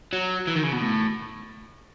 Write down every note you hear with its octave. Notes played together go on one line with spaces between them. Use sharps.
F#3
E3
D#3
C#3
B2
A2